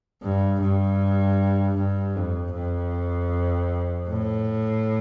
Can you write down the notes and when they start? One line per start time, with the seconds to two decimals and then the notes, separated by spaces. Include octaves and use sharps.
0.22 G2
0.62 G2
1.77 G2
2.16 F2
2.54 F2
4.09 A2